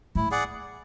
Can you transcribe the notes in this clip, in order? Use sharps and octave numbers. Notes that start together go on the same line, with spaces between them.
A2 E4
G#4 D5 F#5